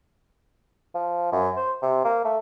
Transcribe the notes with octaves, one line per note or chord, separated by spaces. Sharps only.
F3
F#2
C5
C3
A#3
A3